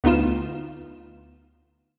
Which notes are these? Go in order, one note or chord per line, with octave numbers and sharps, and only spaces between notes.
D2 B3 D#4 F4 E7